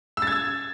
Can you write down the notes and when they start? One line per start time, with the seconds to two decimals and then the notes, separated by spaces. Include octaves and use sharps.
0.17 E6
0.22 A6
0.27 G#6
0.32 E6